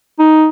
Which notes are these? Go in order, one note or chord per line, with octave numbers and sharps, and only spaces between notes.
D#4